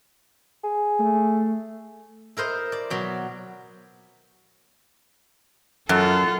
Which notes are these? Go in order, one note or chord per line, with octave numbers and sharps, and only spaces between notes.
G#4
A3
E4 A#4 C5 D#5
D5
B2 F#3
F#2 F4 A4